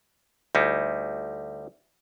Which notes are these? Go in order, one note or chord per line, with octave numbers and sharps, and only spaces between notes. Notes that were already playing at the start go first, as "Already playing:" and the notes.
D2 G3 D#4 E4